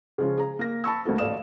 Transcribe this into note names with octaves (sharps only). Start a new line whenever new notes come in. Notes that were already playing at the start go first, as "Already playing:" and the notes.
C#3 F3 G#3 C#4 F4
G#4 A#5
A#3 A#6
A5 B5 C#6 E6
D2 A#3 F#4 A4
A1 A4 D5 F5 D#6 E7